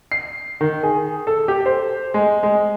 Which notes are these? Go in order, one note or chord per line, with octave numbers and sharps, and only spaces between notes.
C7
D#3
G#4
A4
G4
C5
G#3
G#3